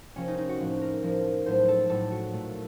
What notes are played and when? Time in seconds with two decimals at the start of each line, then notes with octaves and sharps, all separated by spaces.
0.16 C3 F3 A#3 C#4
0.28 D#4
0.38 D#4
0.49 F#4
0.60 A2 F3 A#3
0.81 A#4
1.03 A2 F3 A#3
1.46 A2 F#3 A3 C5
1.68 A4
1.89 A2 F#3 A3 A4
2.11 F#4
2.33 A#2 A3